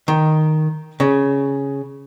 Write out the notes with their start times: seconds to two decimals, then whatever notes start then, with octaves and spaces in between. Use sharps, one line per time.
0.08 D#3
1.00 C#3